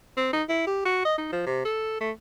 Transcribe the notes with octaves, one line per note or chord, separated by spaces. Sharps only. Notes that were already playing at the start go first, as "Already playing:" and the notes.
C4
D#4
E4
G4
F#4
D#5
D#4
F3
C3
A4
A3